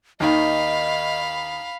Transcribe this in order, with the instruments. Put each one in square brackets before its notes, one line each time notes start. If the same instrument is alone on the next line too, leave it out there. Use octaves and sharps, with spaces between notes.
[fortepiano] D#2 D#3 [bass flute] D#5 [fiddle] F5 B5